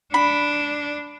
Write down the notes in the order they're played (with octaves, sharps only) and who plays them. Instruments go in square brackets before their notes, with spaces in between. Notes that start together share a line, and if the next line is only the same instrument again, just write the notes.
[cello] D4 [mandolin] B5